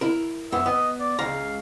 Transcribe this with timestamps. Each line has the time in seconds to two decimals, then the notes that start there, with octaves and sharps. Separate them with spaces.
0.01 E4 A#4
0.52 F#2 B3 E5
0.66 B3 D#5
1.00 D5
1.19 C#2 F5 A#5